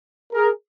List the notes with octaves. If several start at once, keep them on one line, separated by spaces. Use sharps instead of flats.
G#4 A#4